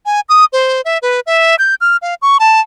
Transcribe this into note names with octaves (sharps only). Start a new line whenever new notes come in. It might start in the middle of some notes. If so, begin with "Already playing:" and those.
G#5
D#6
C5
E5
B4
E5
G6
F6
F5
C#6
A5